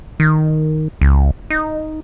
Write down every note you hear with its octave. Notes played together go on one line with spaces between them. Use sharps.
D#3
C#2
D#4